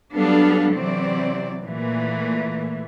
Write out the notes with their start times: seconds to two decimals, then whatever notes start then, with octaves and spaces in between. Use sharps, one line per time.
0.14 F#3 G3 B3 D4 A4 F5
0.75 C3 E3 F#3 C4 D5
1.63 A#2 E3 A3